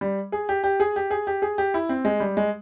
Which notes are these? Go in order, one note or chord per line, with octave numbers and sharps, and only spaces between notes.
G3
G#4
G4
G4
G#4
G4
G#4
G4
G#4
G4
E4
C4
G#3
G3
G#3